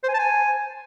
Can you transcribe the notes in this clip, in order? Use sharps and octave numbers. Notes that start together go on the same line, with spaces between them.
C5
G#5
A5
G#5